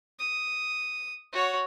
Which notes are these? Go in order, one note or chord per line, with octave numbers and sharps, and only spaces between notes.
D#6
F#4 C#5